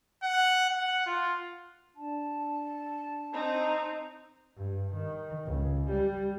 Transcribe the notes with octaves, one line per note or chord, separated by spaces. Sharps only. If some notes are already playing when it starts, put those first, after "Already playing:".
F#5
F#5
F4
D4 A5
C4 D#4 C5
G2
D#3
C#2
G3